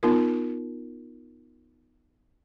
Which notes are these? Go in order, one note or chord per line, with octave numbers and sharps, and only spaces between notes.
B3 D#4 F4 A#4